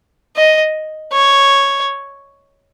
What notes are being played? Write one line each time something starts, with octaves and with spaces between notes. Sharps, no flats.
D#5
C#5